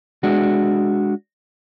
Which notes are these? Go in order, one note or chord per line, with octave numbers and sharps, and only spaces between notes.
G#3 D4 F#4